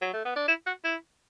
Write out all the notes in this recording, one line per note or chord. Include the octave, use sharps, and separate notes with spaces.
F#3
A3
B3
D4
E4
F#4
E4